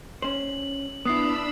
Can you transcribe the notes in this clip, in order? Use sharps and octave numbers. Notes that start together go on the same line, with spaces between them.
C#4 C5 F#7
B3 D4 E4 B5 D#6 E6 C7